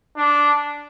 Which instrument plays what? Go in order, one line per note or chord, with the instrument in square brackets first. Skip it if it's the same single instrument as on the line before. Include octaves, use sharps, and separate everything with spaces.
[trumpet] D4